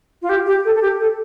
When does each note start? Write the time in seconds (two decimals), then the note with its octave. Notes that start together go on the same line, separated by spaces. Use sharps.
0.22 F4
0.29 G4
0.46 G4
0.65 A4
0.75 A4
0.82 G4
1.00 A4